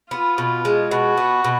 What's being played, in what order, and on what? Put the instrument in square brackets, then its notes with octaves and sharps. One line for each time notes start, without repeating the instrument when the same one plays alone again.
[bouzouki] B3 [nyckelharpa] F4
[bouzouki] B2
G#3
[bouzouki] B2 [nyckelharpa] F#4
[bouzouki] B3
B2